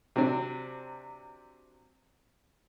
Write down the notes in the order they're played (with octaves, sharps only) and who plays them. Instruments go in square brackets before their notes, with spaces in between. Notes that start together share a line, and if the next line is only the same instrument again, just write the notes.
[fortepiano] C3 F#3 C4 D4